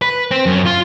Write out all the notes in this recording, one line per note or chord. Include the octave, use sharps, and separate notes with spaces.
B4
C4
F#2
F4